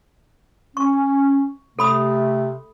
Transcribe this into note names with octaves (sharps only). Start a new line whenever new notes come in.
C#4 C#6
C3 A3 A4 B5 D#6